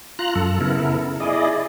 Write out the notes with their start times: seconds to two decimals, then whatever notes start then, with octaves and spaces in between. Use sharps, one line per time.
0.19 F4 A#5 F#6
0.35 F#2 A4
0.61 C#3 B3 E4 A4 A#4
1.20 E4 G#4 D5 D#5